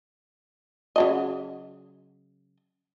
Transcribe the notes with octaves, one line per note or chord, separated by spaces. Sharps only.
C#3 F#3 D#5